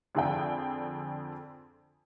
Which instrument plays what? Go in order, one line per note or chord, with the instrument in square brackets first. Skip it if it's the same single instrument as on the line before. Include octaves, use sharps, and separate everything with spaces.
[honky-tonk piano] F2 D3 G#4 D5 G5